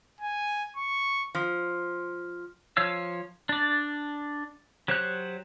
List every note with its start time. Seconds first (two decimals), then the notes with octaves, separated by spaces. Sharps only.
0.20 G#5
0.77 C#6
1.35 F3
2.77 F3 C#5 F5 E6
3.49 D4 D5
4.88 F#3 G4 C5 C#5 F#6